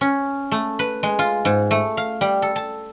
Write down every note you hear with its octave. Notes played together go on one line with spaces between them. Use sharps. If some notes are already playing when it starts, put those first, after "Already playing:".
C#4
A3
B4
G#3
F4
G#2
A3
F5
G3
A4
A5